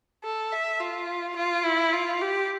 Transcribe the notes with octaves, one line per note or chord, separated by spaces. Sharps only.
A4
E5
F4
F4
E4
F4
G4